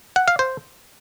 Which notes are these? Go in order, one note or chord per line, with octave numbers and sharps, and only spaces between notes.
F#5
F5
C5